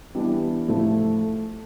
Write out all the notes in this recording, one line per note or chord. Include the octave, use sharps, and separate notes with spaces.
E3 G3 B3 D4
A2 F3 A3 E4